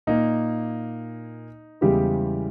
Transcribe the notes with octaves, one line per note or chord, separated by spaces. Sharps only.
A#2 A#3 D#4
E2 C#3 E3 G3 G#3 G4